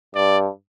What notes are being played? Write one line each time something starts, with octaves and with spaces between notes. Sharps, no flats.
G2 D5